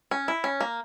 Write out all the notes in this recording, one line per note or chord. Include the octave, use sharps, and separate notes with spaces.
C#4
E4
C#4
A#3